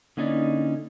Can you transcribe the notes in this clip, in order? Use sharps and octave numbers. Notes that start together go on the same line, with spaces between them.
D3 A#3 C#4 D#4 E4 D5